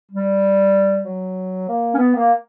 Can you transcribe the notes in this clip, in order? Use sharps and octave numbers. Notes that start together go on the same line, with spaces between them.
G3
F#3
A#3
C#4
B3
A#3